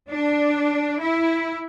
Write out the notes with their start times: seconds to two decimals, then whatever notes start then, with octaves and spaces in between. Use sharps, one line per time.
0.11 D4
1.01 E4